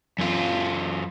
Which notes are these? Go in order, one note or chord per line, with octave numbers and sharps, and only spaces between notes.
F#2 F4